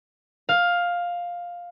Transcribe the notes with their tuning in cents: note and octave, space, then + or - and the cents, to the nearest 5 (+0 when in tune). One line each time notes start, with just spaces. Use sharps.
F5 +10